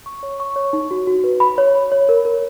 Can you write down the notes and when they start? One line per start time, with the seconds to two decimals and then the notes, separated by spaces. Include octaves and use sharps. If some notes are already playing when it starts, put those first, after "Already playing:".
0.06 C#6
0.23 C#5
0.40 C#6
0.56 C#5
0.73 D#4
0.91 F#4
1.07 F#4
1.24 B4
1.40 B5
1.58 C#5
1.75 B5
1.92 C#5
2.09 A#4
2.25 A#4